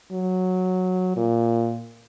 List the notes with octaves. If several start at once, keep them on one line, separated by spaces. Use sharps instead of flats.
F#3
A#2